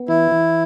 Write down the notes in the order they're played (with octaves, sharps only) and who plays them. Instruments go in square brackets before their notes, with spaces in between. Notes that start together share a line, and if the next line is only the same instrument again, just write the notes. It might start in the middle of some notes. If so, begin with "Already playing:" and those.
Already playing: [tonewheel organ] B3
[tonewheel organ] E3 [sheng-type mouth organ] E4
[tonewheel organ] E3